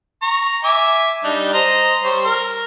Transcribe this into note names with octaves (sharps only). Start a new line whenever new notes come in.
A#5 C#6
E5 G#5 D6
G3 D4 D#4
C5 D#5 A#5
G3 C5 C#5
A#4